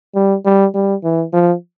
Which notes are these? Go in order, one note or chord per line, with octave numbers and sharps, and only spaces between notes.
G3
G3
G3
E3
F3